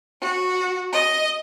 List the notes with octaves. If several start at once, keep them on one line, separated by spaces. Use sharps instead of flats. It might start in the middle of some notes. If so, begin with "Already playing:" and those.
F#4
D#5